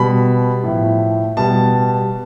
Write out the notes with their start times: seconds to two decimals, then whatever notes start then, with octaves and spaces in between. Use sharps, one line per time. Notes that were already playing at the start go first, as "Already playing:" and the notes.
Already playing: B2 G3 B5
0.64 A2 F3
1.37 B2 G3 A5